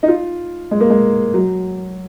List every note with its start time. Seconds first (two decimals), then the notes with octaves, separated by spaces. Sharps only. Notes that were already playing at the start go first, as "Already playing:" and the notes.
0.03 D#4
0.08 F4
0.71 G#3
0.80 A#3
0.90 G#3
1.34 F#3